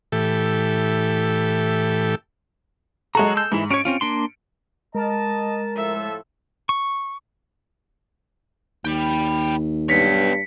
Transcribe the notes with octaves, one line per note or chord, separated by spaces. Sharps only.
A2 E3 G4 A4
F#3 G#3 F#4 A4 A#5
E6 G6
G#2 E3 E4
C#4 C#5 C#7 D7
C4 C#4 F4
A#3 D4 C6
G#3 A#4 D#5 A5
A2 F3 A4 E5
C#6
D#2 G5 B5
G2 B3 C#5 A#6 B6 C#7